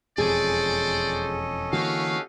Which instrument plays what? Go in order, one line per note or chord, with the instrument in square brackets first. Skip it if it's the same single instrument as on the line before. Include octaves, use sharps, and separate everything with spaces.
[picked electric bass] E1 F2 [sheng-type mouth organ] C#4 A4 D#5 [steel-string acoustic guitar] G#4 [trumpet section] C5 D5
[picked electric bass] D3 E3 A#3 [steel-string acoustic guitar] F#4 [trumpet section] G4 B4 F5